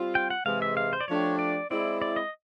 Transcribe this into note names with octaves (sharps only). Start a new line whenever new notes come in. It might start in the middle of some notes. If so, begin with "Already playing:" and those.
Already playing: G3 C4 F4
G5
F#5
C3 E3 G#3 F5
E5
F5
C5
D5
F3 A3 D4 G4 C#5
D5
G#3 C4 E4 D5
D5
D#5